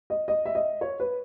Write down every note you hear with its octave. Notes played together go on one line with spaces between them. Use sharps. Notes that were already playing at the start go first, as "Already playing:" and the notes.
D#5
D#5
E5
D#5
C#5
B4